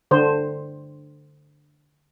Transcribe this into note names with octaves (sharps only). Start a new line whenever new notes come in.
D3 C5